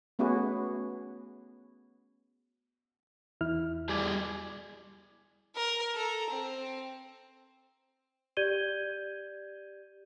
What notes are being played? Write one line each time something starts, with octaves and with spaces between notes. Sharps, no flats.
A3 B3 C#4 F#4 G#4 B4
E2 E4 F6
G3 G4 G#4
A#4
A4 A#5
C4
G4 D5 G6 G#6 D#7 G7